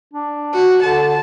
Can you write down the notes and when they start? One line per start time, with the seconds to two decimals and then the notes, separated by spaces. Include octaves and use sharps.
0.13 D4
0.54 F#4
0.83 D3 A5